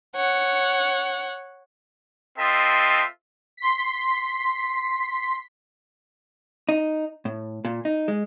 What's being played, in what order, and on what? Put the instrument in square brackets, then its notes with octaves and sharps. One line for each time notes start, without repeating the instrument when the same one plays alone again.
[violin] C#5 F#5
[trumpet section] C4 F4 A4 D#5 E5
[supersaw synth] C6 B6
[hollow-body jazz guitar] D#4
A2
A#2
D#4
G#3